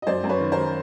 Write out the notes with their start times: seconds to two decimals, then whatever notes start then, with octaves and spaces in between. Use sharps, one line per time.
0.02 D#5
0.07 F#2 C5 D5
0.24 F#2
0.29 B4 C#5
0.41 D#3
0.52 A#4 C5
0.57 D#3